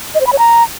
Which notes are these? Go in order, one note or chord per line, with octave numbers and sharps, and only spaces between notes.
D#5
C5
B5
C#5
A#5